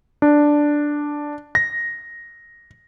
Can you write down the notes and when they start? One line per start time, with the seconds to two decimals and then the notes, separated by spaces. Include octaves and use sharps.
0.22 D4
1.55 A#6